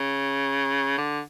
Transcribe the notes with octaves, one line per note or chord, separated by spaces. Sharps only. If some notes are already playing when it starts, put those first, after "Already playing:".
Already playing: C#3
D3